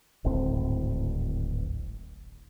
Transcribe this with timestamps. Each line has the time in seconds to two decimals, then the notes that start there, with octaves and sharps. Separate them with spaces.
0.24 D1 G#1 A2 C4